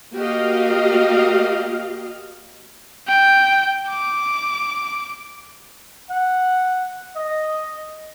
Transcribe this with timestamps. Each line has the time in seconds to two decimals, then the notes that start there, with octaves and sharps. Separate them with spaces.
0.15 A#3 F#4 G4 D#5 F5
3.08 G5
3.88 D6
6.10 F#5
7.16 D#5